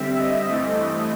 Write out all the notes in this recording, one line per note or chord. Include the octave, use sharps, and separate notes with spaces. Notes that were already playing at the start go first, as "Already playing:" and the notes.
Already playing: D3 G3 C4 E5
D#5
G2 E3 A3 C4